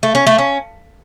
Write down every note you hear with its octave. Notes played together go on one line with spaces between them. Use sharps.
A3
C#4
A3
C#4